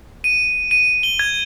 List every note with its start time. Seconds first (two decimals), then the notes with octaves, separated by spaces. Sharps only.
0.24 D#7
0.71 D#7
1.03 G7
1.19 G#6